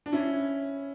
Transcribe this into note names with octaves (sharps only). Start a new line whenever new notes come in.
D4
C#4 E4